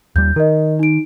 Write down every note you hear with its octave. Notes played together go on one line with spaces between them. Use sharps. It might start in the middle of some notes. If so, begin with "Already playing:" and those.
D#2 G3 G6
D#3 A#4 D#5
D#4 D7